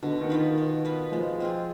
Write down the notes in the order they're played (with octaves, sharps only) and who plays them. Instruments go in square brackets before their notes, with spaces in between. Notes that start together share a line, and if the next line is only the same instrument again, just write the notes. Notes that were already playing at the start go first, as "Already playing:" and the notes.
[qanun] B2 [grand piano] D3
[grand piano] D#3
[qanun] B3 F4 B4
[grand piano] D#3
[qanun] B2
B3 F4 B4
[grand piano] F3 [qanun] G#3
[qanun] C4 F4 G#4